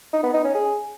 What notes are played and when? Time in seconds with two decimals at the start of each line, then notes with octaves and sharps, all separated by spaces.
0.13 D#4
0.23 B3
0.34 D#4
0.44 C#4
0.55 G#4